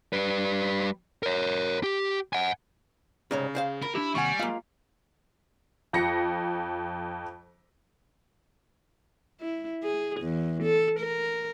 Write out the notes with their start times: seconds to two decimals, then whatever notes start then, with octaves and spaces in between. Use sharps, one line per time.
0.13 G3 B4
1.23 A#4 C#5
1.83 G4
2.33 F#5 G#5
3.31 C2 G#2 C#3 C#5
3.55 G#4 C5 F5
3.82 A#4 B5
3.95 D4 E4 G4
4.15 D#2 C3 G3 F#5 G#5 C#6
4.39 G#3 A#3 F4 F5
5.93 F2 A#6 C#7
9.40 E4
9.83 G#4
10.21 E2
10.63 A4
10.99 A#4